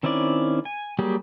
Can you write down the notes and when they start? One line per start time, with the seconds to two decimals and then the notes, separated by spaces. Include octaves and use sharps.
0.03 D#3 C4 C#4 E4 D5
0.65 G#5
0.99 F#3 G3 A#3 G4 G#4